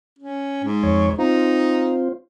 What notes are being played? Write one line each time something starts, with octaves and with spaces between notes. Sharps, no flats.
C#4
G#2
F2 C#5
C4 D#4 F4